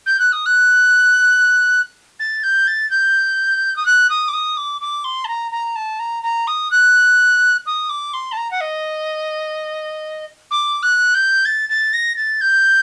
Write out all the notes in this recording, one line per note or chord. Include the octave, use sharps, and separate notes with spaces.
G6
F#6
D#6
F#6
A6
G6
A6
G6
D#6
F#6
D#6
D6
D#6
D6
D6
C6
A5
A#5
A#5
A5
A#5
A#5
D#6
F#6
D#6
D6
C6
A5
A#5
F#5
D#5
D6
F#6
G6
A6
A6
A#6
A6
G6